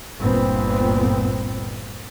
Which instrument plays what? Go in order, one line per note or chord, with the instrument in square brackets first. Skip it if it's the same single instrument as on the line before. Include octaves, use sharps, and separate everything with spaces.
[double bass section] G1 D2 A#2 B3 C4